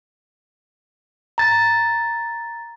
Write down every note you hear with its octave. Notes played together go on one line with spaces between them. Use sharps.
A#5 A6